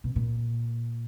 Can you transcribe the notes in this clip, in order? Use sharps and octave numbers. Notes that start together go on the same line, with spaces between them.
B2
A#2